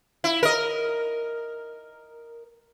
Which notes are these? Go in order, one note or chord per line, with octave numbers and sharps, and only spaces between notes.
E4
A#4 D#5